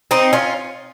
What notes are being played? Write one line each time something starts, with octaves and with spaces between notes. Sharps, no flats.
C4 D#4
C#4 F4